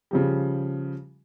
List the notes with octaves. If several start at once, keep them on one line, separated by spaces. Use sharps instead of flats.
C#3 F3 G3